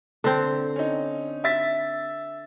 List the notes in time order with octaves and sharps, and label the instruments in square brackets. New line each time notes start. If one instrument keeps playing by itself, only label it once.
[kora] D3 C4
[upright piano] C#4 D#4
E5 A6 B6